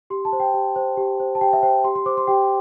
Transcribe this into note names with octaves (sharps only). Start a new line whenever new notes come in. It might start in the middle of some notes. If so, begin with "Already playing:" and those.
G4 C6
A5
C5
G5
G4
C5
G4
C5
A5
G4 G5
E5
C5 G5
G4 C6
C6
C5 D6
C6
G4 G5